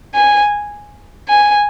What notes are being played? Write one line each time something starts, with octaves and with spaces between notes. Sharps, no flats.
G#5
G#5